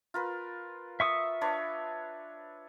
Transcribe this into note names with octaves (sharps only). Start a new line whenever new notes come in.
F4 A#4 B4
E5 C#6 D#6
D4 B4 C#5